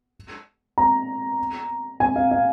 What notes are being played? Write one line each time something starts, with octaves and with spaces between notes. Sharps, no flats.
A#5
G#5
F5
F5